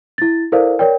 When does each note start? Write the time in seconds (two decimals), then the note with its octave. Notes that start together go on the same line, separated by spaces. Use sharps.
0.18 E4 A6
0.52 E4 A4 A#4 C5 D5 F5
0.79 A#4 C#5 D5 G5